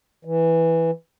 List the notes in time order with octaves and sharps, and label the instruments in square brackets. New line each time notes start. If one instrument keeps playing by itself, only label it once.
[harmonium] E3